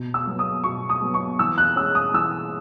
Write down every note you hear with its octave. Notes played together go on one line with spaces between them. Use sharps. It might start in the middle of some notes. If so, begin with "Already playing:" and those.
Already playing: B2
E6
F#3 B3
D#6
B2 C#6
D#6
F#3 B3
C#6
E3 E6
F#6
G#3 C#4 E6
D#6
E3 E6